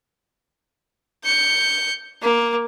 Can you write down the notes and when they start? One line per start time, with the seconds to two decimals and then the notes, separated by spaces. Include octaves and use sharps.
1.24 G6 C#7
2.22 A#3